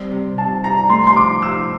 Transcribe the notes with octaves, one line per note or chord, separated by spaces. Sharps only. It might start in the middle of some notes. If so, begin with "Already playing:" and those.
Already playing: G3 C4
C3
C3 A5
D4 A#5
A3 C6
C6
F3 D6
F3 E6